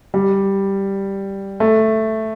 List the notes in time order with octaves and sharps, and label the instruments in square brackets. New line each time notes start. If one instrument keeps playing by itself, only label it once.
[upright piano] G3
A3